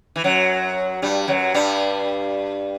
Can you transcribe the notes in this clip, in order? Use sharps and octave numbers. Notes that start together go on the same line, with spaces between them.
E3
F#2 F#3
G2 G3
F#2 F#3
G2 G3